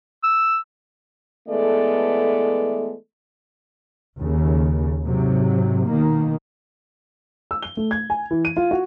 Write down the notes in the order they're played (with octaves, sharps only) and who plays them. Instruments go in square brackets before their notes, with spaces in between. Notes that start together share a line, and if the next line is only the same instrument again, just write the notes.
[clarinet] E6
[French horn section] E3 G#3 A3 B3 A4 D5
[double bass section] D#2 C#3
G#2 C3 F#3
B2 D#3 A#3
[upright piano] E6
G7
A3
G#6
G#5
E3
D#7
F4
F#4